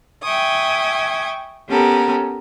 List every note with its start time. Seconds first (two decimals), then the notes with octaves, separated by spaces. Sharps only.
0.23 E5 G5 G#5 C#6 D#6
1.69 B3 C#4 G4 A4 A#4